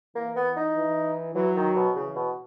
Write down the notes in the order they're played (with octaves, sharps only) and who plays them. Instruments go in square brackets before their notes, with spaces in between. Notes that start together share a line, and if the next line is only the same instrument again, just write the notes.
[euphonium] E3 [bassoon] A#3
[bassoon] B3
D#4
[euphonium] E3
[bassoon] E3 [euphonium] F#3
[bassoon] D#3
B2
[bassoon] C#3 [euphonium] E3
[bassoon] B2